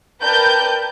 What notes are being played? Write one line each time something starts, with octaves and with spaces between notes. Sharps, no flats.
A#4 B4 D5 G5 A5 G6